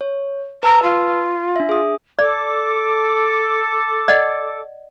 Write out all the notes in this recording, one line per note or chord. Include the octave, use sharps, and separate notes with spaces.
C#5
B4 A5 A#5 E6
F4
D4 E5
G#4 D#6
A4 D5 D6
D5 D#5 F#5